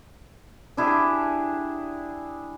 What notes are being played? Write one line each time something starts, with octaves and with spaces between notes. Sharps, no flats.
D4 E4 G4 G#4